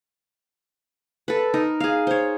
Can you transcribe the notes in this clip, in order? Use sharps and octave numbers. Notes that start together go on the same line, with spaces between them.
A4 B4
D#4 A#4
G#4 F5
C5 C#5